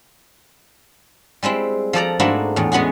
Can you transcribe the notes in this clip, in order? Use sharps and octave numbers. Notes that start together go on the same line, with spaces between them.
G3 G#3 C4 E4
F3 A4 D5 A#5
G#2 A3 A#3 D4 E4 F#4
E2 A2
G#3 B3 C#4 F#4 G#4